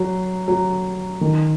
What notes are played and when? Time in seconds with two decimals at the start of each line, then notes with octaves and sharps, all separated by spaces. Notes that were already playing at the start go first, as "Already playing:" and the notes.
Already playing: F#3
0.48 F#3
1.21 D#3